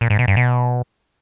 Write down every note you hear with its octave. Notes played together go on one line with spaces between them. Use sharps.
A#2
G#2
B2
G2
B2